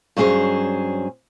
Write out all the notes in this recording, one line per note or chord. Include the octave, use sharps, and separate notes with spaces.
G2 F#3 C#4 G#4 C5